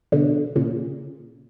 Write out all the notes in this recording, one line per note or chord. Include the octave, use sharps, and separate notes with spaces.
B2 D3
A#2 C#3